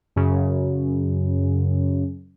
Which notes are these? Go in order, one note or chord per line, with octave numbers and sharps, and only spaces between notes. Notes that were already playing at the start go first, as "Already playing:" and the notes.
F#2 C#3